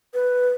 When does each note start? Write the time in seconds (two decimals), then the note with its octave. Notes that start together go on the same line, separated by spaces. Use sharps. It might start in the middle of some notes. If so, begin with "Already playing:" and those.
0.14 B4